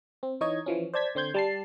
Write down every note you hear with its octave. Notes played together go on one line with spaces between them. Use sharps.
C4
E3 D#4 C#5 D#5 G#6
E3 F3 C#4
C5 D5 A5 G#6 B6
D3 C4 C6 G6 G#6
G3 A5 C7